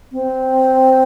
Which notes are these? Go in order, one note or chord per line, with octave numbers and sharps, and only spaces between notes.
C4